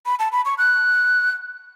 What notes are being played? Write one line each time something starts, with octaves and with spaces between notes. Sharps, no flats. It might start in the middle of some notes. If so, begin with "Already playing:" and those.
B5
A5
B5
C#6
F#6